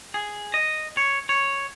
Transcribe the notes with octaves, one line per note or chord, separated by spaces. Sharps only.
G#4
D#5
C#5
C#5